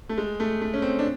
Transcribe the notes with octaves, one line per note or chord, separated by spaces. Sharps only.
A3
G#3
A3
A3
C#4
C4
D4